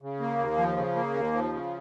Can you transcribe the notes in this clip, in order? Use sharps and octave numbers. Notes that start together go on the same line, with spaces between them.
C#3
A#3
D#2
F3
C#3
A#3
D#2
F3
C#3